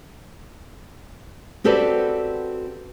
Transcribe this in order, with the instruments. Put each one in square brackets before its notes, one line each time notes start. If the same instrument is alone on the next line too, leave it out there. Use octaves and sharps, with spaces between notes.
[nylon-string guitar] C4 F#4 G4 A4 B4 D5